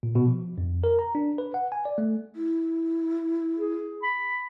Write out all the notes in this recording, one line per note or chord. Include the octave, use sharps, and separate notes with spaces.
A#2
B2
F3
F2
A#4
A#5
D4
B4
F#5
G#5
D5
A3
E4
G#4
B5